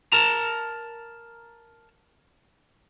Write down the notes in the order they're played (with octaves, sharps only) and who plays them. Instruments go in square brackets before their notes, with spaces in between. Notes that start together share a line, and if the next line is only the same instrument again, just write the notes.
[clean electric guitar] A#4 A5 A#5